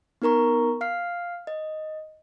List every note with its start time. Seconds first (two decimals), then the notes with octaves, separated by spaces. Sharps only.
0.22 B3 D#4 A#4 A#5 C#6
0.81 F5 F6 C7
1.47 D#5